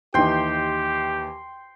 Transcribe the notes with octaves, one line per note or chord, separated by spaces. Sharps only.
D#2 E3 D#4 G4 G5 C6